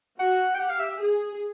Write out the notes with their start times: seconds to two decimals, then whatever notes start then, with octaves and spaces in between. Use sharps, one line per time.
0.19 F#4 F#5
0.55 G5
0.59 G4 F#5
0.70 F5
0.80 E5
1.00 G#4